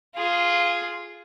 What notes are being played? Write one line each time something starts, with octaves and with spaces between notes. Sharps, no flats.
F4 G#4